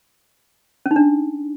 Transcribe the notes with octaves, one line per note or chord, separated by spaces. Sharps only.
C#4
D#4
D4